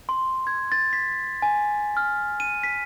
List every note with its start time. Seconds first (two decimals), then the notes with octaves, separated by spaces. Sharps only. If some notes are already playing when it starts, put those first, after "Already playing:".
0.09 C6
0.47 G#6
0.72 A6
0.93 B6
1.42 G#5
1.97 F6
2.40 D#7
2.63 B6